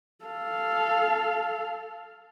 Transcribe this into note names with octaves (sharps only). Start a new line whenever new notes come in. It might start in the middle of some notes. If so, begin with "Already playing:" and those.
A4 F5